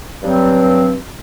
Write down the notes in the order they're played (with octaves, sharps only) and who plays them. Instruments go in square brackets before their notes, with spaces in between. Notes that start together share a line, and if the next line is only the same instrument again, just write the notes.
[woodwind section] G2 F#3 C4